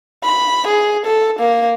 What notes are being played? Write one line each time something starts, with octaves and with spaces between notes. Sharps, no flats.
B5
G#4
A4
A#3